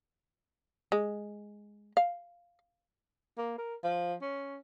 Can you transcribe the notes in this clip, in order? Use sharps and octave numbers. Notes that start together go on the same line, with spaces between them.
G#3
F5
A#3
A#4
F3
C#4